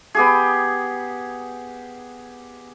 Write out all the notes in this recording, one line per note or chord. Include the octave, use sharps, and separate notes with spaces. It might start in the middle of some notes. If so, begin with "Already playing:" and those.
B3 G4 G#4